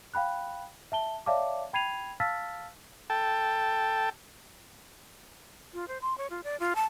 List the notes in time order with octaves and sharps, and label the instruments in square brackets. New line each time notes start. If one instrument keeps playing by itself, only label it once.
[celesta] F5 G5 B5 F#6
E5 A5 G7
C#5 D5 E5 F5 A5 D6
G5 B5 G#6 C7 D#7 F7
F5 A5 E6 F6 A6 B6
[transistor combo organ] A4 G5 A5
[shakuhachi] F4
C5
C6
C#5
F4
D5
F4
A5